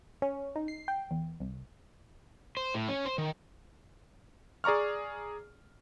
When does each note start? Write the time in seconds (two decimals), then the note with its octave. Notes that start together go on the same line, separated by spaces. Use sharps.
0.22 C#4
0.56 D#4
0.68 C7
0.88 G5
1.11 E2
1.40 C2
2.57 C5
2.74 A2
2.89 C#4
3.05 C5
3.18 D#3
4.64 G#4 D5 A#5 C#6 F6